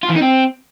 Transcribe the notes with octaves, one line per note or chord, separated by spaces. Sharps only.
F4
E3
D#4
C4